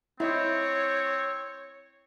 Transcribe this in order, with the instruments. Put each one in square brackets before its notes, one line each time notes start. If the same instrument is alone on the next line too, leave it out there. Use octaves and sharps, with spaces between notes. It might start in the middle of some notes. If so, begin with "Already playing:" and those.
[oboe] C4 [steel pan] E4 D#5 [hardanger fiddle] C#5